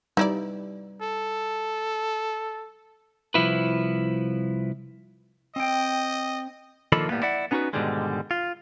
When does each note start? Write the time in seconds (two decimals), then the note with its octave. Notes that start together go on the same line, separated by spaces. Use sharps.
0.17 G3 D#4 E4 B4 D5
1.02 A4
3.34 C2 F3 E4 B4
5.56 C4 D#5 G5
6.92 D3 D#3 F3 A#3 A4 B5
7.09 A2 G3 A#3 B3
7.22 E4 D5 F#5
7.51 B3 C#4 D#4 F4 F#4 B4
7.73 G#2 B2 D3 D#3 G3 G#3
8.31 F4